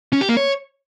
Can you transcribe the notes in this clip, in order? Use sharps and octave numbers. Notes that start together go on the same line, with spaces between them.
C#4
G4
A#3
C#5